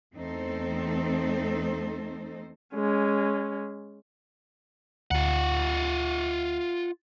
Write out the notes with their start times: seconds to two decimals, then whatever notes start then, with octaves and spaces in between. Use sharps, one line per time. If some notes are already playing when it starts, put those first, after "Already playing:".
0.14 E2 A3 C4 D#4 A4 C5
2.74 G#3 C#4
5.11 D2 F4 F#5